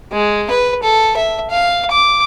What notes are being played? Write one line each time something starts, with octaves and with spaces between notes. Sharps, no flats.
G#3
B4
A4
E5
F5
D6